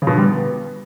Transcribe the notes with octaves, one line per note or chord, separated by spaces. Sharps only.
C#3
B2
D3
G3
B3